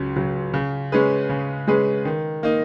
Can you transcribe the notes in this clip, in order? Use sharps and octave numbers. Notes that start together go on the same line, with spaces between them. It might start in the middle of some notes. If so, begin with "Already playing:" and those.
Already playing: C#2 C#3 F#3
C#3 F#3
C#3
G#3 C#4 G#4 B4
C#3
G#3 C#4 G#4 B4
D#3
A#3 D#4